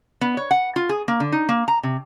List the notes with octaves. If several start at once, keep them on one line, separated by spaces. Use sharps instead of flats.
B3
C#5
F#5
F4
G#4
A#3
D3
D#4
A#3
A#5
C3